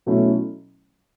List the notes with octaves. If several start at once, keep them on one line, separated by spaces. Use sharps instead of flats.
B2 F#3 A3 C#4 E4